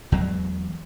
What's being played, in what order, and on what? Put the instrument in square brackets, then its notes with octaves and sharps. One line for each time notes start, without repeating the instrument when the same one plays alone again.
[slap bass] E2 F#3 G#3